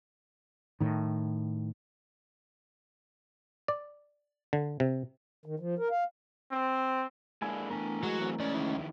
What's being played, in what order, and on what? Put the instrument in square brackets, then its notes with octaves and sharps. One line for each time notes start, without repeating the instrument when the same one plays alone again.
[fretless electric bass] A2 D#3
[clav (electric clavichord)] D5
D3
C3
[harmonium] D#3
F3
A#4
F5
[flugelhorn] C4
[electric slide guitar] G#3 A#3 D4 [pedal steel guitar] E4 G#5
[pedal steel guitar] E3 A3 A#4 [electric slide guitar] B3 D4 G#5
[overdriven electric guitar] F#3 [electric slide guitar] G#3 G#4
[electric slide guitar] E2 C4 G#4
[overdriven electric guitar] C#2 C#3 [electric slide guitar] D5
[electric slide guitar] F2 D#3 E4